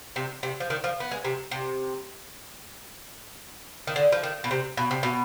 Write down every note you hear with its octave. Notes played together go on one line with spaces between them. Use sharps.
C3
C3
F3
D#3
F3
B3
G#3
C3
C3
D#3
D3
F3
D#3
B2
C3
B2
C3
B2